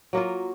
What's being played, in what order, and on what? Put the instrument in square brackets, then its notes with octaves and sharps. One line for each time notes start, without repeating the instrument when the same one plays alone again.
[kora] F#3 A#3 F4